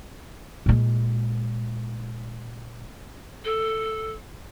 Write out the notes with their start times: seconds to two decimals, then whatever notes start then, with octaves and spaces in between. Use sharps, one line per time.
0.66 A#2 G#3
3.45 A4